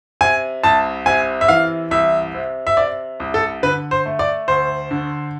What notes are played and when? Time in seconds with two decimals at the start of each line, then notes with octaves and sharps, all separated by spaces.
0.21 C3 G#5
0.64 C2 A5
1.06 C3 G#5
1.41 E5
1.48 E3 F5
1.91 C2 E5
2.35 C3
2.67 E5
2.77 C3 D5
3.20 C2
3.34 A4
3.63 D3 B4
3.91 C5
4.06 A3
4.19 D5
4.48 D2 C5
4.91 D3